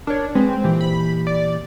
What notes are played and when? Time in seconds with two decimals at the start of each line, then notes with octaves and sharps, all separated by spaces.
0.07 D4 A#4 C#5
0.35 G#3 C4 G#4 B4
0.64 A#2 E3 G4
0.81 B5
1.27 D5